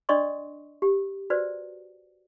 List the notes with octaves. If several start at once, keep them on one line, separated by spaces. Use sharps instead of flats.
D4 D5 D#5 C6 C#6 D#6
G4
F#4 B4 C5 D5